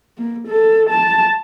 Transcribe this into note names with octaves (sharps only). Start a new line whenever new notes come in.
A#3
A4
A5